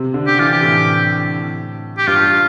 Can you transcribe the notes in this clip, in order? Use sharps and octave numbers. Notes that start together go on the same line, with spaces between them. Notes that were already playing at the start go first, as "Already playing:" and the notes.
Already playing: C3
D3
G4
E3 F4
G4
A2
G4
G2 F4